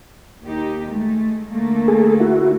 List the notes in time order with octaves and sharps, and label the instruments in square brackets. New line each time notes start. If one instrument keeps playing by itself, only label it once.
[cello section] D#2 D#4 G4
G#3 A3
D3 A3 A#3
[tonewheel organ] G#4 A4
E4 F#4